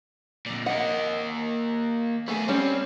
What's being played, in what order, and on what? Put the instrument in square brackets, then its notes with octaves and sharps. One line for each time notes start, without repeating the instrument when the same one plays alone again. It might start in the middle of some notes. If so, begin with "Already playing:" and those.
[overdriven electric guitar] F2 A#2
[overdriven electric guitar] A#3 D#5 [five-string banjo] F#5
[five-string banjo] A3 [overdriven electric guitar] B3 G#4
[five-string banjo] G3 C#4 [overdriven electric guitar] C4